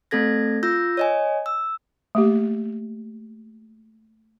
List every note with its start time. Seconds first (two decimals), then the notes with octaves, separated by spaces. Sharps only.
0.11 A3 C4 A4 G#6 A#6
0.63 F4 E6 G6 A#6
0.97 C#5 D#5 G#5
1.46 E6
2.15 A3 A#3 G4